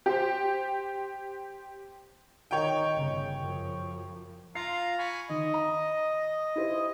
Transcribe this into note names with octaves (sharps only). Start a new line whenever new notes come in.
G4 C5
D#3 D#4 C#5 G5
G1 C#3
F#2 F3
F4 F5 A#5 C7
G#5 B5 C#6
D#3 D#5
A#5
E4 G4 C5